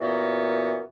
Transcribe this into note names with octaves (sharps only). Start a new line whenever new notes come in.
F#2 A#2 E3 B3 F#4 A#4